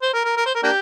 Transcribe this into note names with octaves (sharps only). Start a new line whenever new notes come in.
C5
A#4
A#4
A#4
C5
A#4
A#3 D4 G4